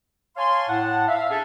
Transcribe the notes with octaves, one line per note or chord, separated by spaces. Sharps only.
C#5 F5 G#5 A5 C6
A2 F#5 A5
E5 F5
D4 G#4 A4